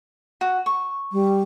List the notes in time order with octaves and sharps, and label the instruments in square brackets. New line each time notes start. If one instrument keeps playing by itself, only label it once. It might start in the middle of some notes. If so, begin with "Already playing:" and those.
[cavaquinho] F#4
C#6
[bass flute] G3